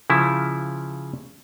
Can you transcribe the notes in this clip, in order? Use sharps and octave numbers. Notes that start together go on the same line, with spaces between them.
C#3 F3 E4